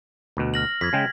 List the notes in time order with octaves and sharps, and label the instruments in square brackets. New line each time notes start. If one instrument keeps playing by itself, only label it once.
[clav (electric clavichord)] D2 B2
[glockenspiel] F6 A#6 F#7
[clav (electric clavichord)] F2 [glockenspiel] G#6 B6
[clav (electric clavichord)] C#3 G#3 G5